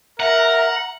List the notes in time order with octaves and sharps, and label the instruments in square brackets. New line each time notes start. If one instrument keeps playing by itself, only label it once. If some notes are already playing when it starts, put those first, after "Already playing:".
[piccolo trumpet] A#4 [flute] E5 [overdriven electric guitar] F#5 [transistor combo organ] A#5